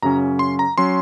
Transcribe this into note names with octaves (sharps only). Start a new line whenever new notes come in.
F#2 C#3 F#3 C#4 A#5
C6
A#5
F#3 C#4 C6